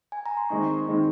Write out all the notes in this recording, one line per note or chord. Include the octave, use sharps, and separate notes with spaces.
G#5
A#5
C6
D#3 G#3 C4 D#4 C#6
D#3 G#3 C4 D#4